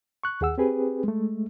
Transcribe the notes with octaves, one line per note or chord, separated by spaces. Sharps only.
C#6 F#6
D#2 G#4 F#5 E6
C4 G4 G#4 B4
G#3 A3